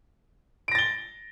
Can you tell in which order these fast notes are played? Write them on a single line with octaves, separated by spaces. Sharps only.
D7 A#6 A6 G7